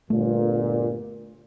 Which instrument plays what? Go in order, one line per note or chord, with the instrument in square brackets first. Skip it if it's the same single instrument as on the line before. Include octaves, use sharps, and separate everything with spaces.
[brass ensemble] G1 A#2 [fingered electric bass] A3